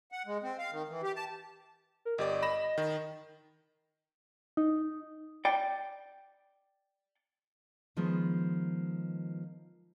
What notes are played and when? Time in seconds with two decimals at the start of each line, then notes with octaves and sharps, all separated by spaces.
0.12 F#5
0.27 G#3
0.43 C4
0.59 F5
0.71 D#3
0.90 E3
1.03 G4
1.16 A5
2.05 A#4
2.18 G1 G4 D5 D#5
2.43 B5 A#6 E7
2.78 D#3
4.57 D#4
5.45 D5 G5
7.97 D#3 F3 G#3 B3